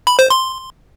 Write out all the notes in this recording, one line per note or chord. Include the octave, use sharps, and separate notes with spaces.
B5
C5
C6